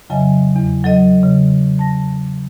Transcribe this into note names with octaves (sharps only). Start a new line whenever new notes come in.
F2 C#3 F#3 D#5 E5 G#5
E2
F#3 A4 D#5
C#3
A5 A#6